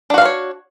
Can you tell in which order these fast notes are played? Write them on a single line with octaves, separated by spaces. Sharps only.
D4 F#4 F5 B4 C#5